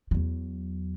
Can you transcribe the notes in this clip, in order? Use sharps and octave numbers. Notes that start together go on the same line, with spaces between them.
E2 F#3